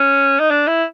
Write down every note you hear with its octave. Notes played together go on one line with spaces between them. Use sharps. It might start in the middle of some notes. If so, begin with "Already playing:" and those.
Already playing: C#4
D#4
D4
E4